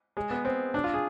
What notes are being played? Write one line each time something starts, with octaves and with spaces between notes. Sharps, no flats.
G#3
B3
C4
D4
F4
G#4